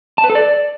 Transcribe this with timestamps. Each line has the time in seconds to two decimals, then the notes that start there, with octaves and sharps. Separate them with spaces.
0.18 A5
0.24 B4
0.30 A4
0.35 D5